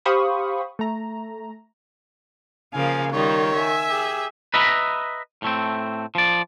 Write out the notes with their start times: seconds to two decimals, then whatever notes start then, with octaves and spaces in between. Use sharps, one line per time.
0.05 G4 C5 F5 B5 C#6 D#6
0.79 A3 A#5
2.74 C#3 F3 A#3 F5 G#5
3.13 D#3 G3 F4 C#5
3.54 E5 G#5 E6
3.90 G4 G#4
4.54 B4 D#5 E5 A#5 B5
5.42 A2 A3 C4
6.15 F3 D5